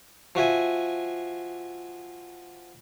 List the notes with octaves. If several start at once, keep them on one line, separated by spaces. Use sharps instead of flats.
F3 F#4 E5 G#5